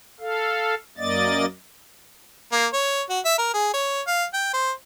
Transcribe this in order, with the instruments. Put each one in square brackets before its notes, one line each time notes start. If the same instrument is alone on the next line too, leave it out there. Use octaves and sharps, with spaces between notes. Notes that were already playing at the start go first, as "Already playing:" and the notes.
[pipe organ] A4 F5
F#2 A#3 D5 D#5 A6
[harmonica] A#3
C#5
F#4
E5
A#4
G#4
C#5
F5
G5
C5